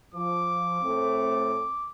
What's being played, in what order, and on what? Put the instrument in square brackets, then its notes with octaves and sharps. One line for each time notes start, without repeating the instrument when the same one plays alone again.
[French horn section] F3 [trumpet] D6
[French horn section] A2 A3 C4